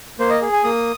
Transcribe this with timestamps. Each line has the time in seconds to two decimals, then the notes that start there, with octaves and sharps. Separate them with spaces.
0.19 A#3 C5
0.30 D#5
0.42 G#4
0.53 G#5
0.64 A#3 D#6